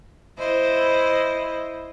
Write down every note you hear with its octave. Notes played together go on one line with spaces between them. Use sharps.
E4 C5 D#5